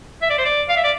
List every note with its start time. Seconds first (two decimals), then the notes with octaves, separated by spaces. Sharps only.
0.22 E5
0.30 D5
0.38 C5
0.45 D5
0.69 F5
0.77 E5
0.84 D5